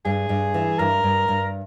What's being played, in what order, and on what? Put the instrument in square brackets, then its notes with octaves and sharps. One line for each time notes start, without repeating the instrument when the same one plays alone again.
[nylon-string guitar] G2 [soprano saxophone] G#4
[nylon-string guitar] G2
E3
[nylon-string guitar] G2 [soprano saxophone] A#4
[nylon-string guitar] G2
G2